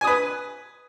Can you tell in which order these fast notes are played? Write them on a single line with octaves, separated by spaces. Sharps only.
G#5 D#6 B4